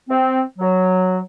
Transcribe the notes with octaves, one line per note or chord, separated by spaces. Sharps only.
C4
F#3